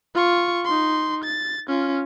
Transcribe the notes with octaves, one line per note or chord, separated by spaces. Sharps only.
F4 C#6
D#4 C6
A6
C#4 F4